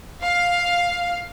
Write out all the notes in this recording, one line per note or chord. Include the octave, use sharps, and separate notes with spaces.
F5